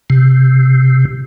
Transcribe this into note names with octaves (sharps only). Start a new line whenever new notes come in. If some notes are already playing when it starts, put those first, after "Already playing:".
C3